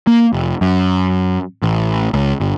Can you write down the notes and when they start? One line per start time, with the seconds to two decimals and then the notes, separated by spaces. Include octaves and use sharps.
0.07 A#3
0.33 F1
0.61 F#2
1.62 A1
2.13 C#2
2.40 G1